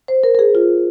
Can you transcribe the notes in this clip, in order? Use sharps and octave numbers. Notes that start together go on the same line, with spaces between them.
C5
A#4
A#4
G#4
F4